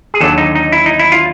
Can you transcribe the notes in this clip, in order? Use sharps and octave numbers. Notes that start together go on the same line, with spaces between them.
G#4
D#2 D3 F#3 A4
D#4
D#4
E4
D#4
E4
F4